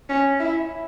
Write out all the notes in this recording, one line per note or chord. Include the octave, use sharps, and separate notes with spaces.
C#4
E4